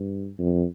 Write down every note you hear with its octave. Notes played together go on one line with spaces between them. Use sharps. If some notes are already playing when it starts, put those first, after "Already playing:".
Already playing: G2
F2